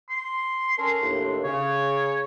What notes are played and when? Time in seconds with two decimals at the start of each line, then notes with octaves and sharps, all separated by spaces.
0.09 C6
0.77 C#4 A4 A#4 C6
1.01 D#2 A2 D4
1.44 C#3 C#5